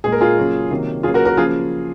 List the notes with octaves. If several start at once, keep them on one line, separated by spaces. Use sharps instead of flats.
A#2 G#3 G#4
A#4
F4 G#4
C#3 F#3 A#3
C3 D#3 F#3 A#3
C#3 F#3 A#3 F4 G#4
F#4 A#4
F#4 A#4
C#3 F3 A#3 F4 G#4